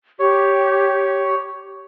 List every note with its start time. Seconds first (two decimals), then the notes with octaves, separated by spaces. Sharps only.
0.19 G4 C#5